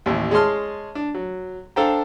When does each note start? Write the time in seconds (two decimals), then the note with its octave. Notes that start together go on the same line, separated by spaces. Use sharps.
0.06 A1 D#2
0.31 G#3 G#4 C#5 A5 C6 F6
0.95 D4
1.15 F#3
1.76 D4 A4 C5 F5 G5 A#5